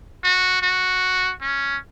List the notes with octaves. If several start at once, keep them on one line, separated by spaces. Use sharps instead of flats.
F#4
F#4
C#4